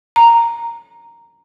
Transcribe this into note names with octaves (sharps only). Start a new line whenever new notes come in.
A#5